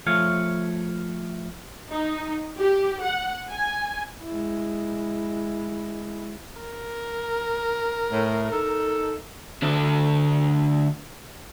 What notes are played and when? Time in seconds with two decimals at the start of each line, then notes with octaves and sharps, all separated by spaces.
0.07 F3 A3 C#5 F5
1.91 D#4
2.58 G4
3.03 F#5
3.50 G#5
4.23 G#3 E4
6.61 A#4
8.12 A2
8.51 D#4 A4
9.62 D2 D4